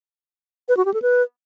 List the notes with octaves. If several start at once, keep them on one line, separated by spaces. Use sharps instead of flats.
B4
F#4
G4
A4
B4